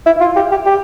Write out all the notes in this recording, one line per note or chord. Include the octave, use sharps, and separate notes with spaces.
E4
F4
G4
G4
G4